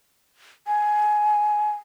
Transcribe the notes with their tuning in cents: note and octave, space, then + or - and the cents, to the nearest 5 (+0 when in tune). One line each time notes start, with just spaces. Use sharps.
G#5 +15